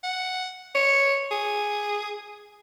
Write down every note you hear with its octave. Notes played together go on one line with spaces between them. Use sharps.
F#5
C#5
G#4